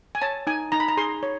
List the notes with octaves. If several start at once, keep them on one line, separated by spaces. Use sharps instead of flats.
G#5
C#5 A5
D#4 G#5
D#4 A#5
B5
A#5
G#4 C6
C#5